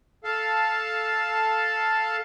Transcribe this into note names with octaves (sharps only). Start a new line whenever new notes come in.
A4 F5 A5